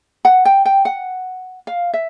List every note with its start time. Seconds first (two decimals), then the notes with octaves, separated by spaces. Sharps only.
0.25 F#5
0.45 G5
0.65 G5
0.85 F#5
1.67 F5
1.94 E5